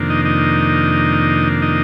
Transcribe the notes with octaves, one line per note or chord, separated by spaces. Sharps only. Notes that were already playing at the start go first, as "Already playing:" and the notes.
Already playing: F2 C3 D#3 A#3 D4
D#4 D#5
D#4 D#5
D#4 D#5